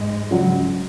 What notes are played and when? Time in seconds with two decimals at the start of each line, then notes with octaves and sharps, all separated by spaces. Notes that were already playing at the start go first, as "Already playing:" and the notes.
Already playing: G#2 G#3
0.31 C#3 F#3